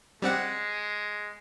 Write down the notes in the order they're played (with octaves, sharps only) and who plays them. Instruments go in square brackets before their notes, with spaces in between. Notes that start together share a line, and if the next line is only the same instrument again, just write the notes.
[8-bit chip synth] G3 C4 F#5 [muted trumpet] G#3